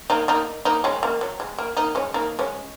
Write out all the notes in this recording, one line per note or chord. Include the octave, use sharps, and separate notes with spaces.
A#3 D#4
A#3 D#4
A#3 D#4
G#3 C#4
A#3
F#3
G#3
A#3
A#3 D#4
G#3 C#4
A#3 D#4
G#3 C#4